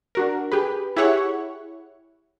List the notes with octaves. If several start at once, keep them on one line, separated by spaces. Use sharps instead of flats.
D4 F#4 A#4
G4 G#4 B4
E4 G4 G#4 C#5 F#5 C#6